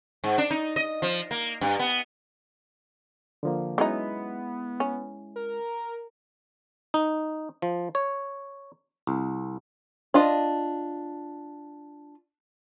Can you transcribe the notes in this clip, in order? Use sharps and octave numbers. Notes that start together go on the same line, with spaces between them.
G#2
D4
D#4
D#5
F3
A#3
G2
B3
D3 F3 A#3
F#3 G#3 B3 C#4 D#4 E4
C#4
A#4
D#4
F3
C#5
C2
D4 F4 D#5